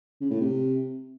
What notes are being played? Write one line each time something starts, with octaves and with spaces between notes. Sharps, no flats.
C#3
A2
C3